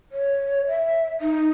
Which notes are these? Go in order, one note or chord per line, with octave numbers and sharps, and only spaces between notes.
C#5
E5
D#4